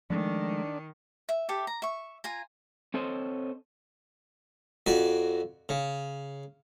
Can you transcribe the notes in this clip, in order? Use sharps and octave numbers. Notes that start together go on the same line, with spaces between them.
D#3 F3 G#3 A3 D4
E5
G4 A4 E5
A#5
E5 C#6
F4 G#5 A#5
C4 A4 C5 C#5 D#5
F2 F#4 D5
C#3